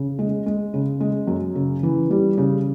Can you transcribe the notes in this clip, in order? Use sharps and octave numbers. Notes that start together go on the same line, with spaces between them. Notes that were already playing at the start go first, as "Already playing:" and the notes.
Already playing: C#3
G#3
G#3
C#3
G#3
F#2
C#3
E3
G3
C#3